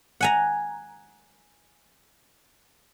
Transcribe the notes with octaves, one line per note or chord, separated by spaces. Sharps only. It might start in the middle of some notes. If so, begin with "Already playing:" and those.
F#5 G#5 A#5